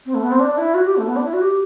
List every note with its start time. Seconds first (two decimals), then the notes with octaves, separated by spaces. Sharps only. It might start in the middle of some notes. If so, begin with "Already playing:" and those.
0.06 C4
0.15 A3
0.23 B3
0.31 C4
0.40 D4
0.58 E4
0.74 F#4
0.85 G4
0.97 A3
1.08 B3
1.16 D4
1.25 E4
1.33 F#4
1.42 G4